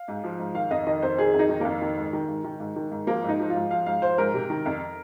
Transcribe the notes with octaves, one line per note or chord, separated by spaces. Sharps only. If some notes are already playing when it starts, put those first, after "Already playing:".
Already playing: F5
G#2
F3
G#2
D#3 F5
F2 D#5
D#3 D#5
F2 C5
D#3 G#4
F2
D#4
D#3
F2 A#3
D#3
G#2
D#3
G#2
D#3
G#2
D#3
G#2
F3 A#3
G#2 D#4
F3
F4
G#2
F3 F5
G#2 F5
F3 C5
G#2 A#4
C3
D#3
F2